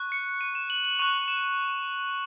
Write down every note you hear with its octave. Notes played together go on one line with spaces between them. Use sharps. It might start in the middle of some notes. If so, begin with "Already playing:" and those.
Already playing: C#6 F#6
C#7
D#7
E7
F#7
F#7
C#6 F#6 F7
E7